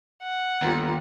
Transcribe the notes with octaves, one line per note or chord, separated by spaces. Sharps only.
F#5
G1 D#2 B3 F4 G4 A#5